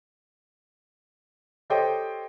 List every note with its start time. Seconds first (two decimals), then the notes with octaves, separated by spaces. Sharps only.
1.70 G4 A4 C5 C#5 D#5 G5